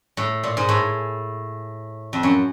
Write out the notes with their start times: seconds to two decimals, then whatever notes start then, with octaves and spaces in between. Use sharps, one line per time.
0.17 A2
0.43 A#2
0.57 G#2
0.69 A2
2.13 F2
2.23 F#2